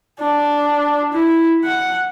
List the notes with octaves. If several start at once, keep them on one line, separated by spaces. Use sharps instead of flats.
D4
E4
F#5